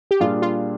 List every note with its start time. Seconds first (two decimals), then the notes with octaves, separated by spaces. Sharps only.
0.11 G4
0.20 A#2 G3 D4 F4 G#4
0.42 F4